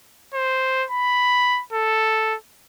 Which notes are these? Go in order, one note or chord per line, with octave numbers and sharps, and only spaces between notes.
C5
B5
A4